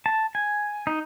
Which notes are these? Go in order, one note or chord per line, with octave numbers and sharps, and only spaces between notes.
A5
G#5
D#4